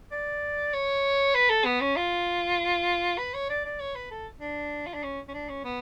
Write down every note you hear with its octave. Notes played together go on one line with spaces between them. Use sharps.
D5
C#5
B4
A4
B3
C#4
F4
B4
C#5
D5
D5
C#5
B4
A4
D4
F4
D4
C#4
C#4
D4
C#4
B3